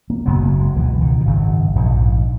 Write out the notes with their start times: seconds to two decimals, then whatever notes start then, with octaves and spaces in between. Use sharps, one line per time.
0.10 A#3
0.26 F#1 F#2 C#3 B3
0.42 A#3
0.60 G#3
0.75 C#2 B2 E3
1.01 D#3
1.21 D#3
1.25 G#1 F#2 C#3
1.75 A#1 G#2